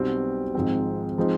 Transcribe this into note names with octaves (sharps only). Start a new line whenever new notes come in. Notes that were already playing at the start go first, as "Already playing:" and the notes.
Already playing: B1 B2 G3 C4
G#1 G#2 F3 G#3 C4
F3 G#3 C4 D#4